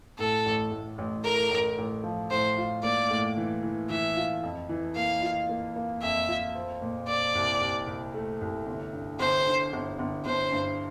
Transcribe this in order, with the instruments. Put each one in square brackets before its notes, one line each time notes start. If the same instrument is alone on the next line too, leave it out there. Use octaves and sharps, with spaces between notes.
[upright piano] A2 [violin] A4
[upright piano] A1
A2
A1
[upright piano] A3 [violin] A#4
[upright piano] A1
A1
F3
[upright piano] A2 [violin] C5
[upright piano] F4
[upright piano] A#3 [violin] D5
[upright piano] A2
E3
E3
[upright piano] E3 [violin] E5
[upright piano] F4
F2
E3
[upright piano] A#3 [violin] F5
[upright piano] F4
A#3
A#3
[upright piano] F2 [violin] E5
[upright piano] F4
C4
A#2
[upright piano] C4 [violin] D5
[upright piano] C2
C2
C2
A3
C2
G1
G2
[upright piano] G1 [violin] C5
[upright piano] D3
G1
G1
[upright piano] G1 [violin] C5
[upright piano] G2